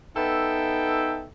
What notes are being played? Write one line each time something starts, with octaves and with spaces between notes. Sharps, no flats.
B3 D#4 A4 E5 G5